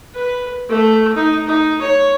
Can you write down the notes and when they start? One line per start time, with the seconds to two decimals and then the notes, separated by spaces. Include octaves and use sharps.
0.15 B4
0.69 A3
1.16 D#4
1.46 D#4
1.81 C#5